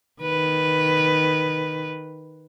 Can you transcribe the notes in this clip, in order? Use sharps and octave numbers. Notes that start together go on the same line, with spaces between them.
D#3 B4